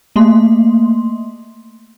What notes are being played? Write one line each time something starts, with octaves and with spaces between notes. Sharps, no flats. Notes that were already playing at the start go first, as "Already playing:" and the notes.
A3 A#3 C6